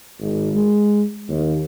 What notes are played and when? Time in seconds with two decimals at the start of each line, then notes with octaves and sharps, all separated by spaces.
0.20 G#1
0.52 G#3
1.29 D#2